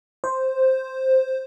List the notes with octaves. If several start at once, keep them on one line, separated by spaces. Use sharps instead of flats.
C5